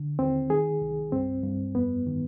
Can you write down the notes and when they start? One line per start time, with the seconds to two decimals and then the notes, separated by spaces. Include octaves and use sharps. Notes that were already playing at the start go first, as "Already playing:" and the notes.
Already playing: D3
0.19 D#2 C4
0.50 D#3 G#4
0.81 C2
1.12 G2 C4
1.43 G2
1.75 F2 B3
2.06 D#3